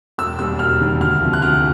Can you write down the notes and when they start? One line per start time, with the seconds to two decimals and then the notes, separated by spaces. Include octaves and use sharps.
0.18 E1 E6
0.39 D#2 D#3 G3 E6
0.59 E1 F6
0.80 D#2 D#3 G3
1.01 D2 F6
1.21 C3 F3
1.33 F#6
1.42 D2 F6